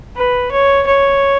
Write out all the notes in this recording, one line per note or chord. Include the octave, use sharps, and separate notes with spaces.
B4
C#5
C#5